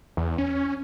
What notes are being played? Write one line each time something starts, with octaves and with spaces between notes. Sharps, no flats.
E2
C#4